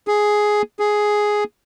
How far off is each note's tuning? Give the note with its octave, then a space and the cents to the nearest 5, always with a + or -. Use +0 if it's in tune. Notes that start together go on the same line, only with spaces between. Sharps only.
G#4 +5
G#4 +5